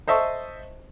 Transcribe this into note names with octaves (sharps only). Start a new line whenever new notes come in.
C5 D#5 E5 A5 C#6